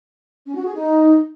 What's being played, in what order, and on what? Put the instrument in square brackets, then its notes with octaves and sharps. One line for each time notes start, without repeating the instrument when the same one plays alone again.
[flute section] C#4
F#4
G#4
D#4